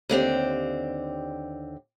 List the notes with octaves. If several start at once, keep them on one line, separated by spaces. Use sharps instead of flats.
D#2 D3 C4 G4